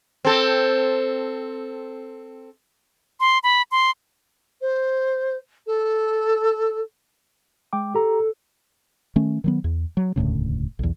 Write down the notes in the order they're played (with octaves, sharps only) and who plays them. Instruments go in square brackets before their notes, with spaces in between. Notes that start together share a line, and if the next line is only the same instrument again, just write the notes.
[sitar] C4 A4
[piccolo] C6
B5
C6
[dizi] C5
A4
[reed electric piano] G#3 G5 D6
[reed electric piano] G4 A#5 [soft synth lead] A4
[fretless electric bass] D#3 A3 C#4
D#3 F#3 B3
E2
F#3
E1 D2 A2 C#3
B1 E2